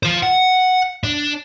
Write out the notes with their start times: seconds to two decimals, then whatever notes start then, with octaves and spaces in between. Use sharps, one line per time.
0.03 F4 C5
0.23 F#5
1.04 D4